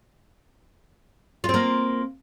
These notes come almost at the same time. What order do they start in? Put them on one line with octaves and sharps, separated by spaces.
F4 C4 A#3